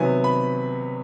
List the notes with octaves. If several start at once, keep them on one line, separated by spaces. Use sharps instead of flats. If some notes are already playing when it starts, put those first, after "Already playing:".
Already playing: C3 D#3 F#3 B3 G#5
B5